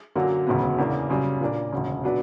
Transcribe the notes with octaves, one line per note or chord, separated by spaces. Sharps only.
F#2 D3 F#3 A#3
E1 D2 C#3 F#3 B3
E2 C#3 E3 A#3 D4
F#2 C#3 G3
A#2 A#3 D4
E1 D2 C#3
B2 F#3 B3 D4